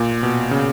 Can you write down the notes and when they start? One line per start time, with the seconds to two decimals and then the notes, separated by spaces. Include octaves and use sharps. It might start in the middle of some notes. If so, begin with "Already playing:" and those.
Already playing: A#2
0.23 B2
0.51 C#3